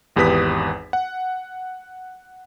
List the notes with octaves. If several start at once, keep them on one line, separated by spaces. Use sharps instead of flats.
G#1 E2 G4 B4 D#6 B6
F#5